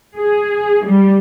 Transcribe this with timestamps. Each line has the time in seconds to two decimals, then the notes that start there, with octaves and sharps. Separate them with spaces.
0.16 G#4
0.84 G3